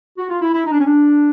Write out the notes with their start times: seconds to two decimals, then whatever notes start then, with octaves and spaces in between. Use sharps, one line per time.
0.18 F#4
0.29 F4
0.42 E4
0.53 E4
0.65 D#4
0.72 D4
0.79 C#4
0.86 D4